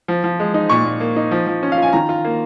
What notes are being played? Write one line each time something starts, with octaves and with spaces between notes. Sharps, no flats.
F3
F3
G#3
D#4
A#2 C#6
A#2
A#3
D#4
F3
F3
C#4
F5
F4 G#5
D#3 A#5
F4
A#3